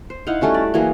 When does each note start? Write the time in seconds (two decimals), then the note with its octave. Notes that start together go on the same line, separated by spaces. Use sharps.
0.10 C5
0.27 D#4 E4 F5 F#5
0.41 G3 A3 C#4 F#4
0.54 D5
0.74 E3 F#3 A#3 G#4